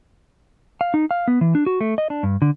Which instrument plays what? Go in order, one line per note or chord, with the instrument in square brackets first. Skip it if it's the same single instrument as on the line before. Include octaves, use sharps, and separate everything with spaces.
[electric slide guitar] F5
D#4
F5
B3
E3
D4
F#4
A3
D#5
D4
G2
D3